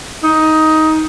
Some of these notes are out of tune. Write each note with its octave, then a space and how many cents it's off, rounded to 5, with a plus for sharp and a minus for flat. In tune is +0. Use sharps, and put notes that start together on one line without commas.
D#4 +15